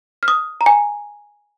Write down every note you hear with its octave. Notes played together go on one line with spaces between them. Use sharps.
F6
D#6
A#5
G#5